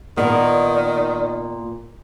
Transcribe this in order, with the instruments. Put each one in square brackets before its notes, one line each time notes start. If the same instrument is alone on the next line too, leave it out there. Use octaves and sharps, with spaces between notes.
[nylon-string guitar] A#2 B3 [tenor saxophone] D#3 [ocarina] D5